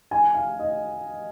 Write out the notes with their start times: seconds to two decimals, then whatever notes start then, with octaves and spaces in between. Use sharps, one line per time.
0.11 G#5
0.34 F5
0.59 D#5